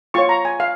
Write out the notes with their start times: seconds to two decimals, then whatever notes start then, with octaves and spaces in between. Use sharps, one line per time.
0.14 F4 C#5 C#6
0.29 A#5
0.45 G#5
0.60 F5